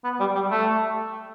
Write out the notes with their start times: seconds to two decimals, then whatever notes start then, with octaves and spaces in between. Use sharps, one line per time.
0.04 B3
0.20 G3
0.35 G3
0.51 A3